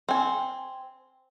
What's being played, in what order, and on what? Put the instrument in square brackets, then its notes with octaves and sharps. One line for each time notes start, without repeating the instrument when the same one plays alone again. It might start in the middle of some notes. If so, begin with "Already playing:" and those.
[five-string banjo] C4 G#5